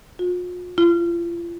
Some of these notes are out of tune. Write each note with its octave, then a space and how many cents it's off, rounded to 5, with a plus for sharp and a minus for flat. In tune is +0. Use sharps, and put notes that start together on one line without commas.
F4 +40
F4 -40